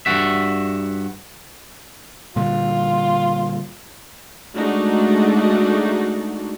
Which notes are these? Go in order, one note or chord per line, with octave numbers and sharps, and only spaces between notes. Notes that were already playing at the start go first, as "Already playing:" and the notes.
G2 F#4 E5
A#2 D3 G3 F4
G#3 A3 D4 D#4 F#4